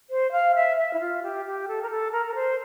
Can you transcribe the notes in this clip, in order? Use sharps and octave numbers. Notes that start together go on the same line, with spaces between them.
C5
F5
E5
E5
E4
F4
G4
G4
A4
A#4
A4
A#4
A#4
C5